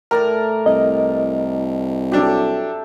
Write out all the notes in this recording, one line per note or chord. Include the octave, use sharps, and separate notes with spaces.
A2 A#4 D5 A#5
C2 D#5
F#3 D4 G4 A4 E5